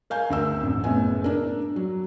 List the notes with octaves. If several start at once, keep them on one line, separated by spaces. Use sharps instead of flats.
A#4 F5 G#5 G6
D2 A#4 E6
A1 F2
F#1 A2 B3 G#5
D4 A#4
F#3